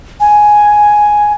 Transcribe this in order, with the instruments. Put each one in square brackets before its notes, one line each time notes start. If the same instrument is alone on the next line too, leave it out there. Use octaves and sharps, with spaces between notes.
[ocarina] G#5